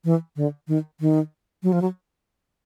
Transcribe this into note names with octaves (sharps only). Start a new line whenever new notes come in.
E3
D3
D#3
D#3
F#3
F3
F#3